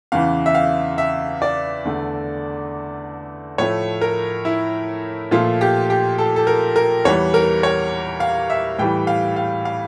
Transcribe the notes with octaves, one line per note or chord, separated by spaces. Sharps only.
E2 C#3 E3 F5
E5
F5
E5
D5
E2 D3 A3
A2 F3 A3 C#5
A#4
E4
A#2 F3 A3 F4
G4
G4
A4
A4
A#4
A#4
E2 E3 G3 C#5
A#4
C#5
F5
E5
A2 E3 G3 G5
F5
F5
F5